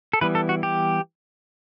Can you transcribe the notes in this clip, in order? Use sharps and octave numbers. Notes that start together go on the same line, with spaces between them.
A4
E3 G3 B3 B4
A4
F#4
G4